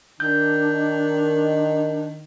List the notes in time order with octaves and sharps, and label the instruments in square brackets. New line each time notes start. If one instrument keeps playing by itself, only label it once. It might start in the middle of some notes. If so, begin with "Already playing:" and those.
[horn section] D#3 [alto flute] D4 [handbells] G6